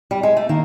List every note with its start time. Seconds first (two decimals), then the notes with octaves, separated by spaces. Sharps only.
0.11 G3
0.23 G#3
0.37 A3
0.49 D#3 A#3